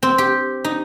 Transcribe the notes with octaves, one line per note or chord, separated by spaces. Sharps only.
C4
G4
D#4